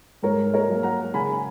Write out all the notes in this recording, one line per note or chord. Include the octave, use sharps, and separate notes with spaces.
G#2 A#4 C#5
A#4 C#5
F#3 A#3
F#5 A#5
C#3 G#5 B5